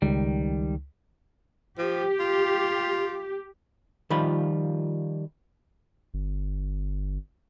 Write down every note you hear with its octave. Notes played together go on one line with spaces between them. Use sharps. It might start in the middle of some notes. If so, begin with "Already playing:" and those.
C#2 D#3 G3
F3 G4
F4
D#3 F3 G3 F4 B5
G1